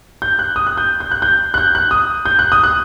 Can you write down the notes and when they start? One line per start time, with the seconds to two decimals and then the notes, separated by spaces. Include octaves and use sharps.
0.22 G6
0.39 F#6
0.56 D#6
0.67 F#6
0.77 G6
1.00 G6
1.11 F#6
1.22 G6
1.54 F#6
1.58 G6
1.75 F#6
1.91 D#6
2.26 G6
2.39 F#6
2.52 D#6
2.63 F#6